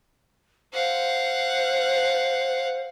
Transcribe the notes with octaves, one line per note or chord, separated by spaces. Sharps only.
C5 F5 F#5